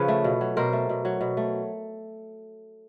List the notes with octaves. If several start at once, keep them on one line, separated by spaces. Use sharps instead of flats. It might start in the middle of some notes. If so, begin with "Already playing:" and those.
Already playing: C#3 F3 B4 C#5
A3
B2
F#3
B2 A#4 C5
A3
B2
F#3
B2
A3